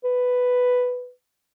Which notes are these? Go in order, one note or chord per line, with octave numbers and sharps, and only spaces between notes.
B4